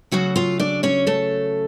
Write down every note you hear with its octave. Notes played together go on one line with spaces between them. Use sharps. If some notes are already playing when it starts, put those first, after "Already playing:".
C#3 F#3 A3 F#4 F#5
F4 F5
D4 D5
C#4 C#5
A3 A4